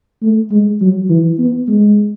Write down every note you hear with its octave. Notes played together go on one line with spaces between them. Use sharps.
A3
G#3
F#3
E3
B3
G#3